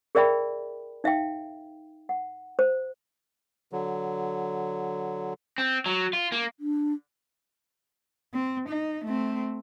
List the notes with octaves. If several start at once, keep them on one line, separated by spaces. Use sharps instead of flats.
G#4 A#4 D5 E5 G5 B5
D#4 E5 F5 G5
F#5
C5
D3 F#3
C4
F#3
F4
A#3
D4
C4
D#4
A3 C4